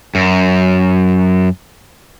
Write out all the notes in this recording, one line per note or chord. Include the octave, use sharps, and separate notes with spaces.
F#2